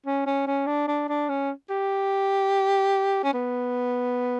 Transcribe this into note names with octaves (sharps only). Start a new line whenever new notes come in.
C#4
C#4
C#4
D4
D4
D4
C#4
G4
C#4
B3